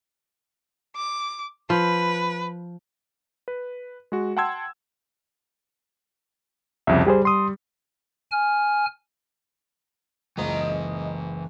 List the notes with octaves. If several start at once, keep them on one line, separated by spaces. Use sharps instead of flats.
D6
F3 B4
B4
G#3 F#4
F#5 G5 A5 C6 E6 G#6
C2 F2 C#3 E5
G3 G4 G#4 C5
C6 D#6
G#5 F6
F#1 C#2 E3 D#5 A#5